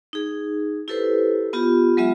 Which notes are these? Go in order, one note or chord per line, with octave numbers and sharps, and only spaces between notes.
D#4 G#4
E4 G4 A4 B4 C5
B3 F4 G4
F#3 G#3 B3 F4 E5